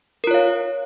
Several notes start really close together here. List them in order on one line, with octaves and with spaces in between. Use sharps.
A#4 F4 C#5 F5